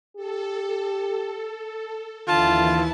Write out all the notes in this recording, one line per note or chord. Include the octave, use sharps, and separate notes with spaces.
G4 A4
D#2 D3 E3 E4 F4 A5